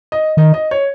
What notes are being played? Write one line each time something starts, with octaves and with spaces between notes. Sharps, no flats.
D#5
D#3 D#5
D#5
C#5